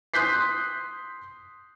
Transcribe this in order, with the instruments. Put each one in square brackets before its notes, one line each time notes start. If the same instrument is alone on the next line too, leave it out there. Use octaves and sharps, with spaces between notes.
[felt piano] C6 D#6 F#6 G6 B6 C7